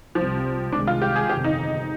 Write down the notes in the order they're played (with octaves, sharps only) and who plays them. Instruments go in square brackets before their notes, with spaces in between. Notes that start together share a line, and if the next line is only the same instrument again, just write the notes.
[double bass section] C2 C3 G3 C4 [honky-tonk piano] F3
[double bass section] C2 C3 D#3 G#3 [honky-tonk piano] D4
[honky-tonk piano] F4
G4
G#4
[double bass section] G1 F2 C3 D#3 [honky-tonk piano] G4
[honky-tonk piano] D#4